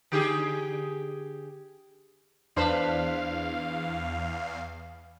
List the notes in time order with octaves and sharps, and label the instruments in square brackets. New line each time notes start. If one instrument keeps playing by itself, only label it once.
[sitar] D3 G4 G#4
[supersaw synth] E2 F5 [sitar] D4 B4 C5